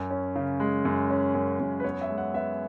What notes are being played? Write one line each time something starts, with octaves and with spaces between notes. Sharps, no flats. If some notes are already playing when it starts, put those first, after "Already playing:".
Already playing: F#2
C#4
C#3
G#3
F#2
C#4
F#2
F#2
B4
B3 C#5
E5
G#3
F#5
B3 E5